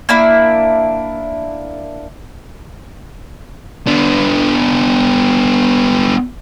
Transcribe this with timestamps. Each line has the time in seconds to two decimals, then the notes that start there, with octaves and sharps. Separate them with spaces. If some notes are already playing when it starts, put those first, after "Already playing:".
0.09 A#3 D4 E4
3.87 B3 D4